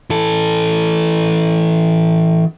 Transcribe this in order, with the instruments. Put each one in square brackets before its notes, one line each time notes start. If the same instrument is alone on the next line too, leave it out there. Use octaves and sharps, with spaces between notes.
[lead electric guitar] E3 A4